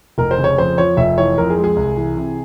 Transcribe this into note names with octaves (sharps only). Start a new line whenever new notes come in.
F1 A#4
C5
C#3
C#5
F2 C5
F3 C#5
F1 E5
E3 C#5
F2 A#4
G#4
G#3
G#4
C2
E3
C3